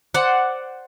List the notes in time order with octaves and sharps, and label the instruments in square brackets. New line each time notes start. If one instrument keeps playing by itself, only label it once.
[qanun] C5 D5 F#5